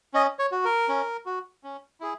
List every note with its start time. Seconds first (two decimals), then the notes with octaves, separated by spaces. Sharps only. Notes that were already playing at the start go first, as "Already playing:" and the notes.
0.14 C#4 D#5
0.39 C#5
0.52 F#4
0.65 A#4
0.88 C#4
1.26 F#4
1.64 C#4
2.00 E4 G#4